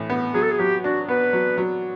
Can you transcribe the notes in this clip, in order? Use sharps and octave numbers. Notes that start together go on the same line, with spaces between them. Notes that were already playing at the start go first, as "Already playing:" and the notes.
Already playing: A2 E3
B3
F#3 G#4
A4
G#4
F#3 G4
D4 F#4
B3 B4
F#3
F#3